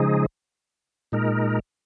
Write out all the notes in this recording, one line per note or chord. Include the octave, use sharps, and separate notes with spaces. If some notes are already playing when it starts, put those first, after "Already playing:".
Already playing: C#3 F3 G#3 D#4 G#4
A#2 G#3 D#4 A#4